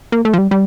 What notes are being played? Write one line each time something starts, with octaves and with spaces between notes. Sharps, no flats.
A#3
A3
F3
G3
G3